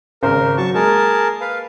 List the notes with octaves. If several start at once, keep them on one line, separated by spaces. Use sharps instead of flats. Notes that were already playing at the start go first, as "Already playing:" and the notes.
G#1 C#3 A#4 C5
F#3 A5 C#6
G#3 A#3 G#4 A#4 A5
B4 F5